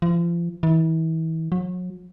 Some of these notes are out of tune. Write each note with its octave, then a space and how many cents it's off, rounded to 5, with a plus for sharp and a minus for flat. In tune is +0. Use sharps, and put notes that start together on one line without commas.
F3 -35
E3 -35
F#3 -35